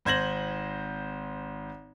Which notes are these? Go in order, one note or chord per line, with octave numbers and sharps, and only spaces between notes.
G#1 C5 G#6 A#6 F#7